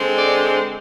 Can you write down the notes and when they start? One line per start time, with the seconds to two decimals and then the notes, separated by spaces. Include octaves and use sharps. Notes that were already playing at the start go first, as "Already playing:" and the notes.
Already playing: D3 G#3 C4
0.18 D5